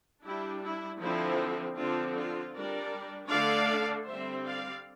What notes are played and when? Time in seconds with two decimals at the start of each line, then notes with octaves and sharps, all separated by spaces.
0.24 G3 D4 E4 G4
0.63 E4
1.01 D3 F3 C4 E4
1.77 D3 F3 C4 D4 F4
2.15 D4 F4
2.54 G3 D4 A#4 D5
3.30 D3 A3 D4 D5 F5
4.07 D3 G3 C4 C5 E5
4.45 D5 F5